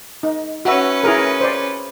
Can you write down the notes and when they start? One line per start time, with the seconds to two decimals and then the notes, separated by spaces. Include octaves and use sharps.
0.23 D#4
0.65 C#4 F#4 B4 E5
1.03 E4 G#4 A#4
1.41 C5 D5